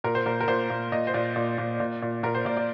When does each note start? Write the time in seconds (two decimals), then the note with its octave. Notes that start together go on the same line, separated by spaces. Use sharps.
0.04 A#2 A#4
0.15 C5
0.26 A#2 A#4
0.40 A#4
0.48 A#2 C5
0.70 A#2
0.92 A#2 D#5
1.07 C5
1.14 A#2 D5
1.36 A#2
1.58 A#2
1.80 A#2
2.02 A#2
2.23 A#2 A#4
2.35 C5
2.45 A#2 D5
2.57 D5